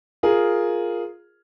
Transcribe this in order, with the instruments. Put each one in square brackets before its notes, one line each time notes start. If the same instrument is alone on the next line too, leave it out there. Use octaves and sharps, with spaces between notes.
[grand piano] F4 G#4 A#4